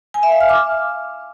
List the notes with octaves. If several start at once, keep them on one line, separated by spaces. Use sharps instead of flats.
G#5
E5
F5
F6
D6